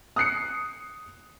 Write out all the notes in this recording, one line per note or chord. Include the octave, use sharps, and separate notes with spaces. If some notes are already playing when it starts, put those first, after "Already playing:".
D#6 F#6 C7 C#7